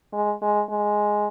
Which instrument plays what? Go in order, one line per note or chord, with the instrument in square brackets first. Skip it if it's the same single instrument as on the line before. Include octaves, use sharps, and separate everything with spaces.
[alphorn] G#3
G#3
G#3